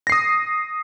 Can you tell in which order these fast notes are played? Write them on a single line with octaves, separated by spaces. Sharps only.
A#6 C7 D#6